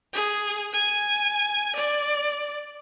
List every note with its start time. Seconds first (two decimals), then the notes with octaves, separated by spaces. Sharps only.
0.13 G#4
0.73 G#5
1.75 D5